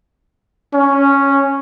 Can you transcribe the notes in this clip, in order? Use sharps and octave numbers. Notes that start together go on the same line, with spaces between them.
C#4